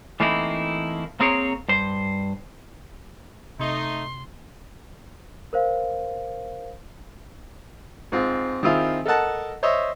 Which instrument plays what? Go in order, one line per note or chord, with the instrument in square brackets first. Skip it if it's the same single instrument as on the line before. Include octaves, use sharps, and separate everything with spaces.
[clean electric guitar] E3 A3 A#3 C4 D#4 E4
A#3 C4 G#4 A#4 C5 C#5
G2 C5
[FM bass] C3 [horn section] A3 D#4 [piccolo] C6
[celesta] A#4 C5 F5
[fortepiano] G#2 C4 F4
D#3 C4 E4 F4 G#4
A4 A#4 D#5 F#5 A5
C5 C#5 D#5 E5